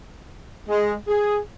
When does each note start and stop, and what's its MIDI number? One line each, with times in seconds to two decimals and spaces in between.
0.68 0.93 56
1.08 1.38 68